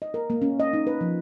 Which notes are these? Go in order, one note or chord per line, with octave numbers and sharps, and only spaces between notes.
D#5
A#4
A#3
C#4
D#5
D#4
B4
F3